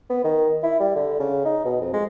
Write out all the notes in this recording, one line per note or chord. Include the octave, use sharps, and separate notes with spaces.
B3
D#3
E4
G3
D3
C#3
D#4
B2
F2
G#3